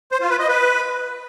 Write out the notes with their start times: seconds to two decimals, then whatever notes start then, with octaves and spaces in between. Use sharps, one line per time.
0.12 C5
0.21 F4
0.30 B4
0.39 D#5
0.49 B4